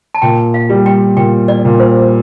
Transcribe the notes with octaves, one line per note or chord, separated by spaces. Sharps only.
A5
A#2 G5
F5
G3
G5
A#2 G5
D5
A#2
C5